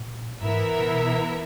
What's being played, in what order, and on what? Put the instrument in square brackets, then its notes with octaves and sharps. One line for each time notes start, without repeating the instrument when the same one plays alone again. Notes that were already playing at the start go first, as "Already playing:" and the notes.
Already playing: [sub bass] A#2
[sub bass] G#2 [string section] E3 B3 E4 A#4 E5
[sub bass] A#2
B2